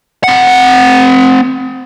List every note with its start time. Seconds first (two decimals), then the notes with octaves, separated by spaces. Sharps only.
0.24 C4 F#5